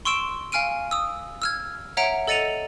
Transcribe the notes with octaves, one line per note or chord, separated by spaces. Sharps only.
C6 C#6 E6 D7 E7
F5 G#5 F6 D7 D#7
D#6 E6
E6 F6 G#6
C#5 E5 F#5 A#5 D7
A4 D#5 A6 C#7 D#7 F7